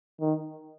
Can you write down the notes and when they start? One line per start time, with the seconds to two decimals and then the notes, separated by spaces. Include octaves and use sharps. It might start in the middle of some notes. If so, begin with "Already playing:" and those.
0.20 D#3